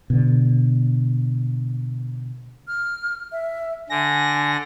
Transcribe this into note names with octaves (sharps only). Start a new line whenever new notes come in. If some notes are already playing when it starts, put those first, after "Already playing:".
B2 D3
F6
E5
D3 G#5 A#6